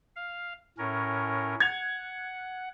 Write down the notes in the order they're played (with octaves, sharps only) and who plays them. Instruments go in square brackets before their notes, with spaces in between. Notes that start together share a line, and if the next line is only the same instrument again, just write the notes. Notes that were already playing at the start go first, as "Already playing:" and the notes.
[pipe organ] F5
A2 C#4 A#4
[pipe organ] F#5 [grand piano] G#6 F7